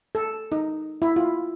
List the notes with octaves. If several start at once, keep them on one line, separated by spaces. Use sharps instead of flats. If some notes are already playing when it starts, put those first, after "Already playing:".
A4
D#4
E4
F4